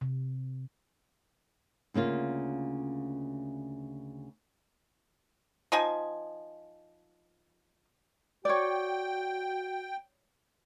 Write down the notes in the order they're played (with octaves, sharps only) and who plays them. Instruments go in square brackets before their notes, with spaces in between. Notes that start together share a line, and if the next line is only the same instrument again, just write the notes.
[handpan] C3
[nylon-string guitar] D2 C#3 A#3 F4
[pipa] F3 D#4 D#5 G#5
[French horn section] F#4 [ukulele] C#5 D5 [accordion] G5